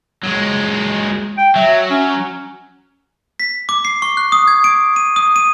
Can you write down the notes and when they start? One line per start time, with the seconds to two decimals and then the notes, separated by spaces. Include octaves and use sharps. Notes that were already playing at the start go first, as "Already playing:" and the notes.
0.23 F#3 G#3
1.38 G5
1.56 F#3 E5
1.91 C#4
3.40 B6
3.69 D6
3.85 C7
4.02 C#6
4.17 F#6
4.32 D#6
4.48 G#6
4.64 D7
4.96 D#7
5.16 D#6
5.36 D#7